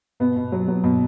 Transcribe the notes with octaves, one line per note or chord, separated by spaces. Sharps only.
B2 B3
B2
F#3
F#3
B2